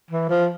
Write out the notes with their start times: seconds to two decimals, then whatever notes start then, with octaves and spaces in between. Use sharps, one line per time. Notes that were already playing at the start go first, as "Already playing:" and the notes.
0.11 E3
0.30 F3